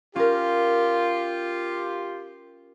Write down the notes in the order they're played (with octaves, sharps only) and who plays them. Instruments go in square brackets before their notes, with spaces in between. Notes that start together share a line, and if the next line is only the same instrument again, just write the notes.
[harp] C#4 A#4 [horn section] F4 G4